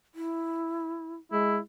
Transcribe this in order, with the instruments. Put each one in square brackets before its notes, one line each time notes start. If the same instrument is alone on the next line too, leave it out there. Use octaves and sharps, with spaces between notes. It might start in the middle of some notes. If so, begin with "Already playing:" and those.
[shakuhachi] E4
[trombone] G#3 [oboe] E4